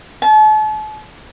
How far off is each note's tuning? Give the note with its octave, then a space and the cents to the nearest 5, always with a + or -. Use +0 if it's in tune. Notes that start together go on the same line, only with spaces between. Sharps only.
A5 -40